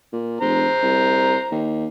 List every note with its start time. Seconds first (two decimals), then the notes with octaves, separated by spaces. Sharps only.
0.13 A#2
0.41 F1 C5 A#5
0.82 C2
1.51 D#2